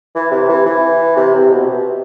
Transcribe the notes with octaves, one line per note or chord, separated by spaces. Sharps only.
E3
C3
E3
E3
C3
C3
B2
C3